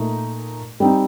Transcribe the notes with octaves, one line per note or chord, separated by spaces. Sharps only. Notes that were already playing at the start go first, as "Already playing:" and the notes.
Already playing: A#2 A3 D#4
G3 C4 D#4